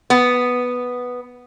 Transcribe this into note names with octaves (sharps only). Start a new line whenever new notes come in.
B3